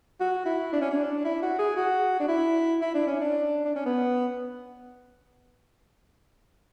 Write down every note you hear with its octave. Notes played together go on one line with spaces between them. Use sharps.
F#4
E4
D4
C#4
D4
E4
F#4
G#4
F#4
D4
E4
E4
D4
C#4
D4
D4
C#4
B3